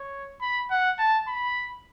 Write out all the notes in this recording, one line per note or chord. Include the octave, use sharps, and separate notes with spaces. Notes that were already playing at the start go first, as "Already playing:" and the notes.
Already playing: C#5
B5
F#5
A5
B5